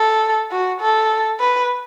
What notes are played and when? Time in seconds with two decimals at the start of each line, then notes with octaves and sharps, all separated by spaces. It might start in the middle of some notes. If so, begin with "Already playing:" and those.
Already playing: A4
0.51 F#4
0.81 A4
1.40 B4